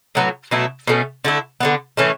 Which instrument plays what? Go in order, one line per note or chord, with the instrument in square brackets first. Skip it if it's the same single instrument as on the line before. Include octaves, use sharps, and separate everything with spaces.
[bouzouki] A2 F#3 B3
B2 F#3 A3 E4
B2 A3 C#4
D3 A3 E4
D3 G3 B3
A2 E3 A3 C#4